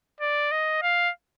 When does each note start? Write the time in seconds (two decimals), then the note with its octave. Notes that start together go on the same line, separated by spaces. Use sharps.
0.20 D5
0.51 D#5
0.82 F5